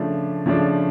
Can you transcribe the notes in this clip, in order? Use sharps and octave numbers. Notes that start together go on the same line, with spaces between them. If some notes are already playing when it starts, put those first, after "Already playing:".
Already playing: C#3 F3 A3 D4
C#3 F3 A3 D4